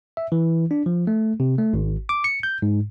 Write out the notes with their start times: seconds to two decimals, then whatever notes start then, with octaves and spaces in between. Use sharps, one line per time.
0.17 E5
0.32 E3
0.71 D4
0.86 F3
1.07 A3
1.40 C3
1.58 A3
1.73 G#1
2.09 D6
2.24 C#7
2.43 G6
2.62 G#2